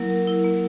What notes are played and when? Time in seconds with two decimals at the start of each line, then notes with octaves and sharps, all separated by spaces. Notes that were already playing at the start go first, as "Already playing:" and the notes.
Already playing: F#3 A#3 E4 A#4
0.10 A#4
0.28 E4
0.44 A#3